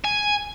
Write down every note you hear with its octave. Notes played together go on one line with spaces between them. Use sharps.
G#5